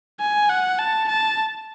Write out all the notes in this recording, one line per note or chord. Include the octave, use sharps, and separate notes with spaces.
G#5
F#5
A5
A5